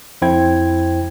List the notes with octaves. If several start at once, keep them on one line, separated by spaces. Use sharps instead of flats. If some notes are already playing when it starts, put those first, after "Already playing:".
F2 E4 C5 G5 G#6